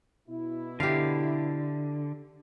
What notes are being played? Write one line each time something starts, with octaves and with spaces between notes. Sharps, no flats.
B2 E4
D3 G4 F5